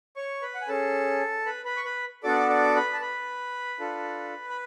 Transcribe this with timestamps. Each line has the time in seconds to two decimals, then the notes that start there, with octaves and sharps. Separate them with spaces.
0.16 C#5 C#6
0.42 B4 B5
0.55 F#5
0.61 G#5
0.68 C#4 G#4 A4 A5
1.46 B4 B5
1.65 B4 B5
1.77 C#6
1.84 B4 B5
2.24 B3 D4 F#4 A4 D5 D6
2.50 D5 D6
2.76 B4 B5
2.93 A5
3.01 B4 B5
3.80 D4 F4 A4
4.50 B5